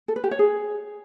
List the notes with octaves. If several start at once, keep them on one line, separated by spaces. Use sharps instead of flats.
A4
B4
G4
C#5
G#4